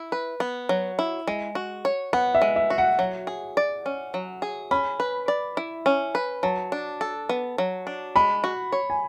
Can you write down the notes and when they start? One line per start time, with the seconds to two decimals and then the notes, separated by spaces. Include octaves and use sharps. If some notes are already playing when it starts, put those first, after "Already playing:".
Already playing: E4
0.12 B4
0.40 B3
0.69 F#3
0.99 E4
1.28 G#3
1.55 F#4
1.85 C#5
2.13 B3 F#5
2.35 E5
2.42 G#3
2.56 E5
2.70 F#4
2.78 F#5
2.99 F#3
3.27 G#4
3.57 D5
3.86 C#4
4.14 F#3
4.42 G#4
4.71 C#4 B5
5.00 B4
5.28 D5
5.57 E4
5.86 C#4
6.15 B4
6.43 F#3 A5
6.72 D4
7.01 A4
7.29 B3
7.58 F#3
7.87 D4
8.16 G#3 B5
8.44 F#4
8.72 C#5
8.90 G#5